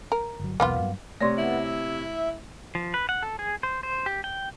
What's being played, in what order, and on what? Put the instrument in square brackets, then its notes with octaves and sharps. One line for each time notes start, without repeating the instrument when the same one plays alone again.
[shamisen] A#4
[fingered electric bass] G1 F#3
[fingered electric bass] E1 B1 E2 [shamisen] A#3 B3 F4
[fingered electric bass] G2 F#3
[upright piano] C3 C#5 A#6 [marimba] A3 D5 C6
[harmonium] B3 [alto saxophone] E4
[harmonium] E5
[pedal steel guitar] F3
B4
F#5
A4
G#4
C5
C5
G4
G5